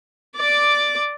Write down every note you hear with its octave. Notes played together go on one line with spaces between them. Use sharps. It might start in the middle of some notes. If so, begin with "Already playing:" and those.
D5 D6